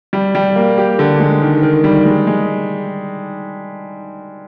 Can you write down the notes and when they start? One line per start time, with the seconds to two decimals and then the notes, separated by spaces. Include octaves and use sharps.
0.13 G3
0.35 G3
0.56 A#3
0.78 G4
0.99 D3
1.20 G#3
1.41 D#3
1.63 D#3
1.84 G3
2.05 G#3
2.27 G#3